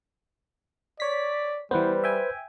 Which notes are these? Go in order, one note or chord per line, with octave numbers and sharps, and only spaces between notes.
C#5 D5 B6
E3 G3 B3 B4 C5
E5 G5 G#5